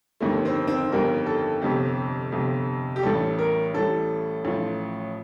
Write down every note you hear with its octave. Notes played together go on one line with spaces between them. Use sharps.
G1 F2 D#3 G3 A3
C4
C4
G1 F2 D#3 G3 A#4
A4
G1 F2 C3 G4
G1 F2 C3
G4
A1 A2 G3 A4
A#4
A1 A2 G3 A4
A1 A2 F3